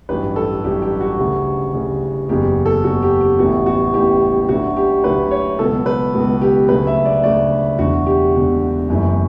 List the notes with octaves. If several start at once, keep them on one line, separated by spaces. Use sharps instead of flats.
A1 G2 F#3 B4
A4
A1 G2 F#3 G4
G4
F#4
D2 C#3 G3
D2 C#3 G3
F#1 E2 C#3 F#3 G4
A4
F#1 E2 C#3 F#3 F#4
G4
G4
A1 A2 G3 B3 F#4
F#4
A1 A2 G3 B3 G4
D2 D3 F#3 A3 F#4
G4
D2 D3 F#3 A3 B4
C#5
C#2 B2 F#3 B3 A4
B4
C#2 B2 F#3 B3
G4
D2 C#3 F#3 A3 B4
E5
D5
D2 C#3 F#3 A3 D5
E1 E2 D3 A3 F#4
G4
E1 E2 D3 A3
F#1 F#2 E3 A3